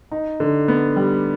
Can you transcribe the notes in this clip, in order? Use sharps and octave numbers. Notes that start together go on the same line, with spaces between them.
D#4
D3
B3
G3